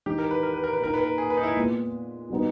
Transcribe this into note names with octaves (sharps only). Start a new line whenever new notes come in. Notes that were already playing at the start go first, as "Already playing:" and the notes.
E3 G#3 D#4 G4
A#4
B4
A#4
B4
A#4
B4
A#2 A#3 D#4 A#4
B4
A#4
G#4
B4
D#4
E4
A#2 G#3 B3
B2 G3 B3 D#4